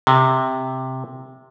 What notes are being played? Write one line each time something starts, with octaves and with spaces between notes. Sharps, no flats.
C3